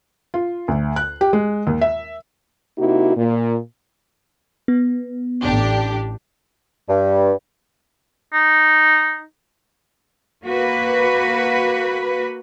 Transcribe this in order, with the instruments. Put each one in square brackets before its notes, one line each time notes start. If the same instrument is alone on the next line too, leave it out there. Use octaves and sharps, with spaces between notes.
[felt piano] F4
D2
F#6
G4
G#3
D#2
E5
[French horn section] C3 A#3 D#4 E4 F#4
A#2
[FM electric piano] B3
[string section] A1 D4 G4
[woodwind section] G2
[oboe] D#4
[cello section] A#3 F#4 B4